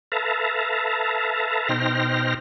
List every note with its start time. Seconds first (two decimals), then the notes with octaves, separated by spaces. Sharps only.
0.12 A4 B4 E5 F5 A5 A#5
1.69 B2 D#4 C5 G5 F6 A#6